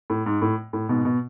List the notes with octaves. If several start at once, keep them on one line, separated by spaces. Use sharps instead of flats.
A2
G#2
A2
A2
G#2 B2
B2